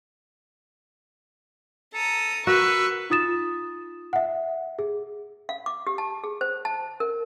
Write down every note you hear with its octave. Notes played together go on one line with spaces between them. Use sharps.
A4 A#5 D#6
F#4 A#4 B4 C#6 E6
D#4 F4 D#6 A6 E7
E5 F#5
G#4
F5
D6
G4
A5
G#4
C5
A5
A#4